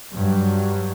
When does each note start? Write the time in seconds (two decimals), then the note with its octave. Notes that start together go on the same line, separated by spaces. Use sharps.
0.13 G2 F#3